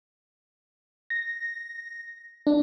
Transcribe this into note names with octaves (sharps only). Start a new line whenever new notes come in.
A#6
D4